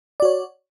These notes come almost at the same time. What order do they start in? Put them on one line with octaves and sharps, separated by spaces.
D5 F#4 C#5